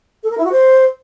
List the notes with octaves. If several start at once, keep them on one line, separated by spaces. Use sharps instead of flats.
A4
A#4
E4
F#4
C5